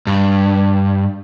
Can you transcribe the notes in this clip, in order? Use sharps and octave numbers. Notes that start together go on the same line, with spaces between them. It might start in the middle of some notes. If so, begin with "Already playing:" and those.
G2